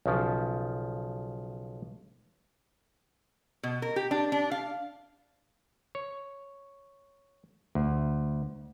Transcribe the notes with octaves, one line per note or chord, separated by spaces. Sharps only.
B1 C#3 F3
B2
A#4
G4
D4
D4
F5
C#5
D2